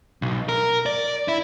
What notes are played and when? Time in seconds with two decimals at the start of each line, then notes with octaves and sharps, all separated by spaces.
0.22 B1
0.49 A#4
0.86 D5
1.28 E4